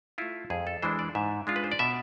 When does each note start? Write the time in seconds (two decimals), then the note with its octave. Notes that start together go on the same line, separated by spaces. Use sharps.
0.18 A3 E4 F4
0.50 F2 G#4
0.67 A4
0.82 E3 G#3 D4 C5
0.99 D5
1.15 G#2 E5
1.47 G#3 D4 F4
1.56 B4
1.64 C5
1.72 D5
1.79 B2 E5